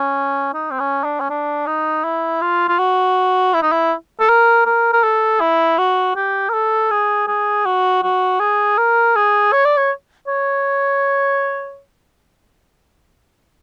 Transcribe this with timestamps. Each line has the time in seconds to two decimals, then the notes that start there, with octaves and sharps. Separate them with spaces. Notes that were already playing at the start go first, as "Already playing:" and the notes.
Already playing: C#4
0.54 D#4
0.71 C4
0.79 C#4
1.04 D4
1.20 C#4
1.29 D4
1.66 D#4
2.04 E4
2.41 F4
2.68 F4
2.79 F#4
3.54 E4
3.62 D#4
3.72 E4
4.20 A4
4.29 A#4
4.66 A#4
4.93 A#4
5.03 A4
5.40 E4
5.78 F#4
6.16 G4
6.49 A#4
6.53 A4
6.91 G#4
7.27 G#4
7.66 F#4
8.03 F#4
8.40 G#4
8.78 A#4
9.15 G#4
9.52 C#5
9.65 D5
9.77 C#5
10.27 C#5